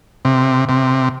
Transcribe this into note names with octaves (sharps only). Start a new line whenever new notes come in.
C3
C3